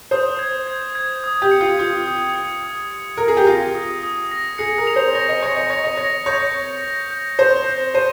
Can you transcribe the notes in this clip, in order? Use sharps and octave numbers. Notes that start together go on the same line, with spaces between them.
C5 D#6
G#6
G#6
G#6
D#6
G4
C#7
F4
F4 D#6
D#6
C#7
D#6
C#7
A#4 D#6
G#4
G4
F4 A#6
D#6
D#6
A#6
G#4 C#7
A#4
F7
C5
C#5 A#6
D#5
C#5 C#7
D#5
C#5 A#6
D#5
C#5 A#6
C#5 G6
F7
A#6
G6
C5 G6
G6
C5 D#7